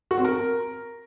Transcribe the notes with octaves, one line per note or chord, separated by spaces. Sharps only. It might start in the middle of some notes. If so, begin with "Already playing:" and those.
F#4
C4
A#4